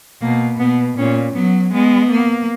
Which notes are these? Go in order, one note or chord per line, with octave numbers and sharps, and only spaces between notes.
B2 A#3
B2 B3
A#2 C#4
F#3 B3
G#3 B3
A#3